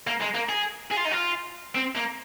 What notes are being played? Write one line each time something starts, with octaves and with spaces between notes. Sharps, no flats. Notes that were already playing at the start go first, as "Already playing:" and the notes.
A#3
G#3
A#3
G#4
G#4
F4
D#4
F4
C4
A#3